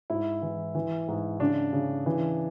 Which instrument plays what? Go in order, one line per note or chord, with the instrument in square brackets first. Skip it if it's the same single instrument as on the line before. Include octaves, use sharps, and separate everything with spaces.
[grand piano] G#2 E4
E3
E3
G#2
C#3 D4
C#3
E3